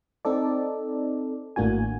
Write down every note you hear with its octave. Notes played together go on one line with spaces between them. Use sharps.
C4 D#4 A4 D5
G#1 A2 A#3 D4 F#4 G#5